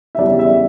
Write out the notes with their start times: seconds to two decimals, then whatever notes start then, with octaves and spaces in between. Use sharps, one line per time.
0.15 E5
0.18 E2 C#3 G3 C#4 D5
0.39 E5